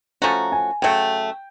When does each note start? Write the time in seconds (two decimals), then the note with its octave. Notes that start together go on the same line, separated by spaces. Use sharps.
0.22 F3 A3 C#4 F#4 A#5
0.52 G#5
0.82 C#3 F#3 A3 G5